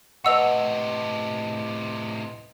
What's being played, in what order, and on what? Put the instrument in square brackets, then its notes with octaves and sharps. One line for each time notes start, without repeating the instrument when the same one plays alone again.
[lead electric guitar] A2 C3 [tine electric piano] B4 D#5 C#6 [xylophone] F#5 E6 F7